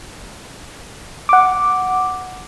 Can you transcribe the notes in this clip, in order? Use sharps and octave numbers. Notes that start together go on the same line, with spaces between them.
F#5 D6